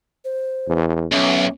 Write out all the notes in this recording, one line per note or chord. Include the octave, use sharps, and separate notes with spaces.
C5
E2
B1 C#4 E5